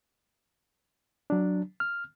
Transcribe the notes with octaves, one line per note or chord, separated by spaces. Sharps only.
F#3 D4
F6